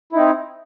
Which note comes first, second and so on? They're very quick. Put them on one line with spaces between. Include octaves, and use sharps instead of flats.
E4 D#4 C4